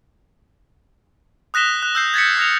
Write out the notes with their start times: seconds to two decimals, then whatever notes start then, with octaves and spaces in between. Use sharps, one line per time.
1.54 D#6 F#6 A#6 B6 E7 G7
1.83 F#6
1.95 E6 G6 C7
2.14 G#6 A6 B6 C#7
2.37 D#6 F6 A#6 E7 F7